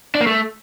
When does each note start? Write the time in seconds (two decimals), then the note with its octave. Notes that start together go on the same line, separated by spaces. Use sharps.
0.15 D4
0.21 A#3
0.27 A3